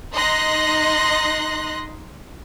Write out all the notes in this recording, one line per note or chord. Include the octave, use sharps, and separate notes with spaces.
D#4 D#5 C6 F#6 A#6